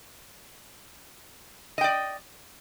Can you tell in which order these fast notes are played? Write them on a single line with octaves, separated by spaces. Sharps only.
D#5 G5 D5